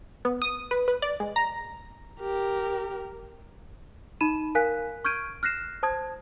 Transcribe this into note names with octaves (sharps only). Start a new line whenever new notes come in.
B3
D#6
B4
B4
D5
G#3
A#5
G4 A#4
D#4 B5 D#7 E7
A#4 F5 G#5 F#6 B6
C#6 F6 G6 G#6 D7 D#7
F6 F#6 A#6 C7 E7
C5 A5 D#6 G#6